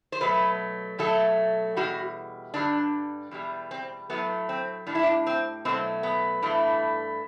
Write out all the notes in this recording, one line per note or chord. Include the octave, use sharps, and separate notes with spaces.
C5
B2 F#3 A3 B4
B2 F#3 A3 A4
E2 B2 G3 F#4
G2 D3 G3 D4
E2 B2 G3
C4
A2 F#3 A3 B3
C4
A2 G3 D4
E4
D4
C4
B2 F#3 A3 C4
B3
G2 E3 A3